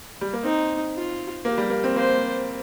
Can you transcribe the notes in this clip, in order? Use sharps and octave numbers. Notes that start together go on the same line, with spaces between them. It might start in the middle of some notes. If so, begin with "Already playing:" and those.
G3
A#3
C4 D#4
F4
A#3 G4
G3
A#3
C4
A#3 C5